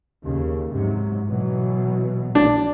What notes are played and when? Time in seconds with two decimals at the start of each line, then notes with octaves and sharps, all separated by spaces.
0.23 D#2 C#3
0.72 G#2 C3 F#3
1.27 B2 E3 F#3
2.35 A#1 D4